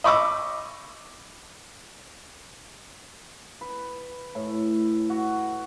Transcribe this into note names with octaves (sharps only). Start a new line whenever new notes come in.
D#5 B5 C#6 D6 E6
B4
A2
F#4